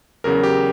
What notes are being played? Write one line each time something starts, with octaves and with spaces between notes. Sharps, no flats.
E2 C#3 F#3 A#4
G4